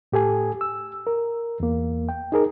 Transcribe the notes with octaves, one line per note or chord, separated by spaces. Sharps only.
A2 G4 A4 G#5
E6
A#4
E2 A#3
G5
D#4 G#4 A#4